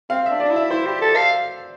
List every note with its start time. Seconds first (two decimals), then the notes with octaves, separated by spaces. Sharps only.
0.10 C4 F5
0.26 E5
0.30 D4
0.40 D5
0.44 D4
0.50 E4
0.56 E5
0.71 E4 C5
0.86 G4
1.01 A4
1.16 F5